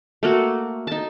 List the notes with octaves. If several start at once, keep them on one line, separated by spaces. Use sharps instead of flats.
A3 A#3 F#4
D#4 A5